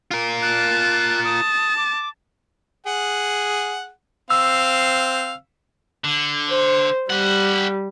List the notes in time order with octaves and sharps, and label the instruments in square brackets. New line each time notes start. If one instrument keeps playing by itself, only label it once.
[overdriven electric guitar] F4 A#4
[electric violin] A5 [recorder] F#6
[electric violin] A5 [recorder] D#6
[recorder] D6
[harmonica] G#4 F#5
[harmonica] C4 F5 [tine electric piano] E6
[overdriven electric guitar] D3
[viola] C5
[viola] G3 [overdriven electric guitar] G4 F#5